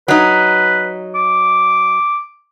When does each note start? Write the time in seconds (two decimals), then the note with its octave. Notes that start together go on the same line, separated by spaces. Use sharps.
0.08 F#3 D#4 B4
1.15 D6